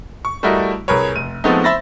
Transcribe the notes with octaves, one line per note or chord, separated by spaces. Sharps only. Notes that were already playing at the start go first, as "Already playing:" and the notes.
C#6
G3 A3 E4 F#4 A#4 D#5
C2 G#4 A#4 B4 C#5
F1 D#7
F3 G#3 A3 B3 C4 D#4
C5 E5 B5 A6 A#6